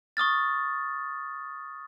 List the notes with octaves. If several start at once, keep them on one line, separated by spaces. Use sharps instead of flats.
C#6 D#6 F6 A6